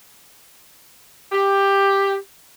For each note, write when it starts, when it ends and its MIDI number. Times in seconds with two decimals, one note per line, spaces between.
1.32 2.16 67